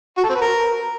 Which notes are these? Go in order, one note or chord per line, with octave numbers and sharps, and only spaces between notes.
F#4
A4
C4
B4
A#4